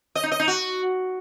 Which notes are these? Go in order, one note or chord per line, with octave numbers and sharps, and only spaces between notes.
D#5
D#4
D#5
D#4
F#4